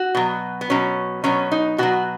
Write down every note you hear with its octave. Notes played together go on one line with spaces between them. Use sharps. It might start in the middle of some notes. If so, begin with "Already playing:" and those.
Already playing: F#4
B2 F#3
B3
B2 F#3 C#4
B2 F#3 C#4
D#4
B2 F#3 F#4